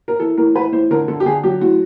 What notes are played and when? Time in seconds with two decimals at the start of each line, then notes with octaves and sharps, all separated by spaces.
0.08 A#4
0.20 E3 A4
0.38 A2 A#4
0.55 E3 B4
0.72 A2 C5
0.91 D3 A#4
1.08 D3 A4
1.20 G4
1.26 D3 G#4
1.43 F#3 G4
1.61 A2 F#4